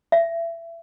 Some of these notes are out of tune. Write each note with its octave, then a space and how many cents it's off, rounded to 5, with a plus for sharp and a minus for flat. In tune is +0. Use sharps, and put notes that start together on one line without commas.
E5 +25